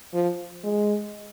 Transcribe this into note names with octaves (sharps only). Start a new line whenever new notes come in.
F3
G#3